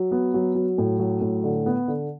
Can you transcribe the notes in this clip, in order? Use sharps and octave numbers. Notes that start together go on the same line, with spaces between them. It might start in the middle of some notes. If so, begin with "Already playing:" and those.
Already playing: F#3
B3
F#3
F#3
A2
F#3
A2
D3
B3
D3